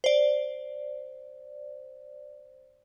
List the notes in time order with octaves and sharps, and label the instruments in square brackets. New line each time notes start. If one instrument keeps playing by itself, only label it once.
[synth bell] C5 D5